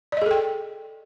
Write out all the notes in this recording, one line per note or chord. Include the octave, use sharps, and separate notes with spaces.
G#4 A4 D5 D#5 G5